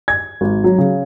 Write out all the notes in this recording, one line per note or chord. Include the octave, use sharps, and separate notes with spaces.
G#6
G#1
F#3
C#3